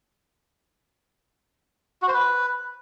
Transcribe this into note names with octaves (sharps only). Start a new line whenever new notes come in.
F#4
C5
B4